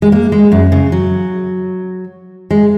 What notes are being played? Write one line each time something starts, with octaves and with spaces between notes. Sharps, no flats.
G#3
A#3
G#3
F#2
C#3
F#3
G#3